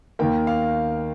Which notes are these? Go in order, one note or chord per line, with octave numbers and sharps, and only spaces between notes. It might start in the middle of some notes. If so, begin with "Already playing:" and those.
D#2 D#3 A#3 G5
F5